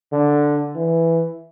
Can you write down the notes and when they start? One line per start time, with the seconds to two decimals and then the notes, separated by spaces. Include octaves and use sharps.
0.13 D3
0.75 E3